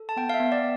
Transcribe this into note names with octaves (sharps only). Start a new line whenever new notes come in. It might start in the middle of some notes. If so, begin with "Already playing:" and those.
Already playing: A4
A5
B3 G5
F5
E5
B3
D5